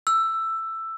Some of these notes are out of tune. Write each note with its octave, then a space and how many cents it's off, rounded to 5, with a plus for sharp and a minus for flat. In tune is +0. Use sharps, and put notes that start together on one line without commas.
E6 +10